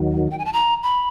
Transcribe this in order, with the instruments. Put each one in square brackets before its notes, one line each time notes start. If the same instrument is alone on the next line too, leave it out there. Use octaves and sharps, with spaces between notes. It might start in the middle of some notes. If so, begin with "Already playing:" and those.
Already playing: [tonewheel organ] D#2 D#3 F#3
[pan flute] G5
G#5
A5
A#5
B5